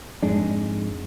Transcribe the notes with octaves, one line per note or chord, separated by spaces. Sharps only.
F2 G#2 G#3 D4